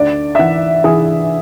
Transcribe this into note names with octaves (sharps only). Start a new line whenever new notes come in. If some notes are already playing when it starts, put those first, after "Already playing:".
Already playing: D2 D5
E5
E3 F#5
E3 G#4